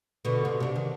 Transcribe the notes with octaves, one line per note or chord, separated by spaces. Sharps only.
B2 D3
C3
C3 D4
D#3